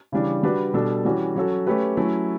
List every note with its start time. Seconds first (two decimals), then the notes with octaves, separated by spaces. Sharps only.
0.12 C#3 E3 G3 D4
0.43 G3 D4 F#4 B4
0.74 B2 G3 D4 A4
1.05 E3 G3 C#4 F#4
1.36 F#3 C#4 F#4 A4
1.67 A3 C#4 G4 B4
1.97 F#3 A3 C#4 E4